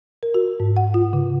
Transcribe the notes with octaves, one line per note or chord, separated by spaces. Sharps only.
A#4
F#4
G#2
F#5
F4
C#3